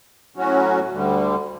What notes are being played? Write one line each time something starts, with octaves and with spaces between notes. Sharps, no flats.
A2 F#3 C#4 F#4
D2 D3 G3